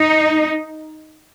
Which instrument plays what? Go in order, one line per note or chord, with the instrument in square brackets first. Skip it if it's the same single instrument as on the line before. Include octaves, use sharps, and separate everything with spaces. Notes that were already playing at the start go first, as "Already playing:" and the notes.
Already playing: [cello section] D#4